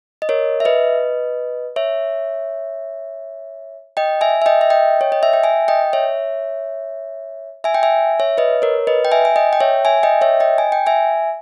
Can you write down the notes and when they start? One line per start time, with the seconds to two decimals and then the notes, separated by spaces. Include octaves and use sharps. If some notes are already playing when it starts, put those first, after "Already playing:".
0.22 D#5
0.29 A#4 C#5
0.60 E5
0.65 B4 D#5
1.76 C#5 E5
3.97 D#5 G5
4.21 E5 G#5
4.42 E5
4.46 D#5 G5
4.61 E5
4.70 D#5 G5
5.01 C#5
5.12 D#5
5.23 E5
5.33 G5
5.44 E5 G#5
5.68 D#5 G5
5.93 C#5 E5
7.64 E5 G#5
7.74 G5
7.83 E5 G#5
8.20 C#5 E5
8.38 B4 D#5
8.62 A#4 C#5
8.87 B4 D#5
9.05 G5
9.12 E5 G#5
9.25 G#5
9.36 D#5 G5
9.53 G5
9.61 C#5 E5
9.85 E5 G#5
10.03 D#5 G5
10.21 C#5 E5
10.40 D#5 G5
10.58 G#5
10.72 G5
10.87 E5 G#5